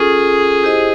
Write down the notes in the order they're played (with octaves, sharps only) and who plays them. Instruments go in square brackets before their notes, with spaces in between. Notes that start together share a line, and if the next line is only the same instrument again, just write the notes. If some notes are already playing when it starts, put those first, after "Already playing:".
Already playing: [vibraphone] C#4 F4 A4 [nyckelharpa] G#4
[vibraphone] E4 G4 C5 D#5